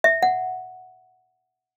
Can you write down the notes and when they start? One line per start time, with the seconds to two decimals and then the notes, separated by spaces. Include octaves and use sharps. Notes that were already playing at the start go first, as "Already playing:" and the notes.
0.04 E5
0.23 F#5